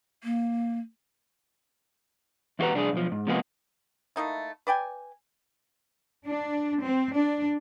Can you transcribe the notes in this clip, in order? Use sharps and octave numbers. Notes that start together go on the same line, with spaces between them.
A#3
E2 E4 F#4 G4 B4 A#5
C2 D4 E4 G#4
B1 F3
G#2
C3 F3 G#3 A#3 B3 G#4
A3 A#3 D#4 E4
B4 D5 G5 G#5
D4
C4
D4